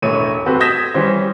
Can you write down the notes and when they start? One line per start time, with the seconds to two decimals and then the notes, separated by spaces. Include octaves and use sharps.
0.02 E1 A1 A3 C#5 D#7
0.46 C4 F#4 G4 A4 B4 C5
0.60 D#6 G6 G#6 A#6 B6 E7
0.94 E3 G3 C#4 C5